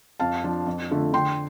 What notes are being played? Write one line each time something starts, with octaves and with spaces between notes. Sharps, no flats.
F2 F5 A5
F3 D4 F4
F2
D3 A3 F4
D3 G5 C6